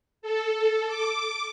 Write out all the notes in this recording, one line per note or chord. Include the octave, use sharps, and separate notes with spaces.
A4
D6